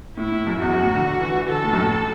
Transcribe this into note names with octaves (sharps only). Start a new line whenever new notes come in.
A2 E4
A2
F#2
E2 F#4
F#2
A2
D3
D3
E3
E3
D3 A4
A2
F#2
A2